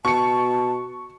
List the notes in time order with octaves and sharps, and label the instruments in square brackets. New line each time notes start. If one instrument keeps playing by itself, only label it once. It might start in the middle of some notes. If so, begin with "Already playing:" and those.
[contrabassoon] B2 [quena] A5 [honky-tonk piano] C#6 C#7